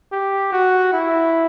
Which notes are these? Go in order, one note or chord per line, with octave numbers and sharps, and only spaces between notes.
G4
F#4
E4